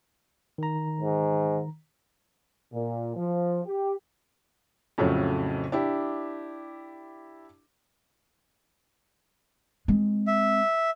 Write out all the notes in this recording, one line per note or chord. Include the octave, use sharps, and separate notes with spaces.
D#3 A#5
G#2
A#2
F3
G4
F2 A2 C#3 F#3
D4 E4 G4
G#3 C4
E5